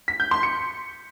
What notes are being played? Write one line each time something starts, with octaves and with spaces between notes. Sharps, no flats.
B6
G6
C6
C#7